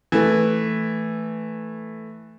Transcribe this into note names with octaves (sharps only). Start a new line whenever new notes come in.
E3 A3